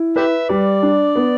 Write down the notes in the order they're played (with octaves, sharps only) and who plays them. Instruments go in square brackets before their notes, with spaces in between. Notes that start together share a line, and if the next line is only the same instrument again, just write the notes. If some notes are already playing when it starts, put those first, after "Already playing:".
Already playing: [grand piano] E4
[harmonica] G4 E5 [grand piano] B4
[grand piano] G3 [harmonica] D5
[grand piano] D4
B3